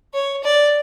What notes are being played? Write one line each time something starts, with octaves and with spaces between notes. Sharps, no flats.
C#5
D5